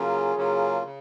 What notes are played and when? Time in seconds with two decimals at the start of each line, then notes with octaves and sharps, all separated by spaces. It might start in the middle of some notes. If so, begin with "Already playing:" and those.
Already playing: C#3 F#3 A#3 C#4 F4 G#4
0.36 C#3 F#3 A#3 C#4 F4
0.86 C#3